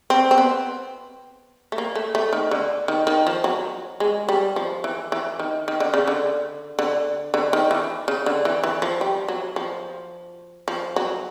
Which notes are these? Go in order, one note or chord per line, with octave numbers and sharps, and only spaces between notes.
C4
C4
B3
A3
A#3
A3
A3
D#3
D3
D#3
D#3
F3
F#3
G#3
G3
F3
E3
E3
D#3
D#3
D3
C#3
D3
D3
D3
D#3
E3
C#3
D3
E3
E3
F3
G3
F#3
F3
F3
F#3